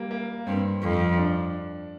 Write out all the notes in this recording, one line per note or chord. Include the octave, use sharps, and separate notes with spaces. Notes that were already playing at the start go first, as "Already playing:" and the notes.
Already playing: G3 A#3
A#3
G2 C4
F2
D4